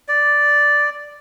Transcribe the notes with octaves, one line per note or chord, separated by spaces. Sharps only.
D5